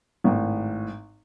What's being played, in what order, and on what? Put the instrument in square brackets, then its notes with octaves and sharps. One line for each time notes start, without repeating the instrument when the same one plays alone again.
[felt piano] G#1 A2